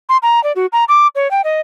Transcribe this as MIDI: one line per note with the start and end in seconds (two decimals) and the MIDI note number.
0.09 0.17 84
0.23 0.43 82
0.44 0.52 74
0.56 0.66 66
0.73 0.84 82
0.89 1.07 86
1.15 1.30 73
1.31 1.42 79
1.44 1.61 75